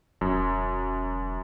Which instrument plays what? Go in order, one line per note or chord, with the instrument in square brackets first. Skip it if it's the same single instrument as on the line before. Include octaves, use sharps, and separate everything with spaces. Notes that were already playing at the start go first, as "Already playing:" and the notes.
[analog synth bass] E1 [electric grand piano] F#2